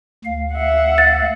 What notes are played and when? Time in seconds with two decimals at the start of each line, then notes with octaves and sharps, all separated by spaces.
0.25 D2 F5
0.54 E5 F#5
0.98 A6